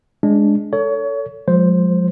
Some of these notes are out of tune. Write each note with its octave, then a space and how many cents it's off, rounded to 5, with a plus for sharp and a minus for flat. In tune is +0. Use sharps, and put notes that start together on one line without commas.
G#3 +5 D4 -10
A4 +20 C#5 +30
F3 +45 G#3 +5 C5 +0